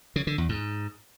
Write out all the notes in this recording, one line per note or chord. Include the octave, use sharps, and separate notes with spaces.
C#3
D3
E2
G#2